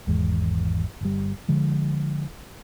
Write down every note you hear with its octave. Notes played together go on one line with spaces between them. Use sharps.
G#1 E2 G#3
G1 G3
D3 F3 G#3